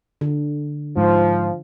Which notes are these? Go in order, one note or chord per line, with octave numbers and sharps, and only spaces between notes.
D3
G#2 F3